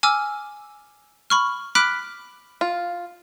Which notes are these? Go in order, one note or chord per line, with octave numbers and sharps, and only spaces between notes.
G#5 D6 E6 F6
B5 C#6 F6
B5 D6 F6 F#6 B6 D7
F4